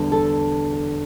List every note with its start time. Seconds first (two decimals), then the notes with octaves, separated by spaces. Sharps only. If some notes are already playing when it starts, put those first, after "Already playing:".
Already playing: E2 D3 G3
0.12 A4